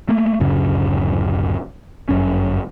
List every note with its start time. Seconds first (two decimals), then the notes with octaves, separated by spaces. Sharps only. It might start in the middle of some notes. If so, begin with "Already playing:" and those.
0.09 A3 A#3
0.40 D1 F#2 C#3
2.09 G1 F#2 C#4